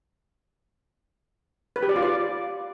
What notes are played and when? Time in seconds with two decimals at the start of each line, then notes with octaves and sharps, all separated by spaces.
1.76 B4
1.83 G4
1.89 D5
1.96 F4
2.02 D5